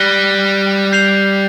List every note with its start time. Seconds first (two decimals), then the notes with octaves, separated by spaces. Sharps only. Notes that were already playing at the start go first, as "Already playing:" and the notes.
Already playing: G3 F#6 A#6 D#7 G7
0.92 G6 C7 F7